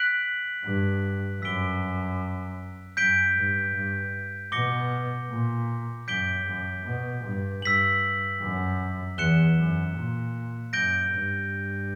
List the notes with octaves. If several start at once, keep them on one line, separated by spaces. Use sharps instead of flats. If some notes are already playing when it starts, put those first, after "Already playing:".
Already playing: F#6 B6 D7 F#7
G2
F#2 E6 B6 D7 G7
F#2 G6 B6 D7 G7
G2
G2
B2 D6 A#6 C#7 G7
A#2
F#2 G6 B6 D7 G7
F#2
B2
G2
G2 E6 B6 F#7
F#2
E2 F#6 C#7 E7 G7
F#2
A#2
F#2 G6 A#6 D7 G7
G2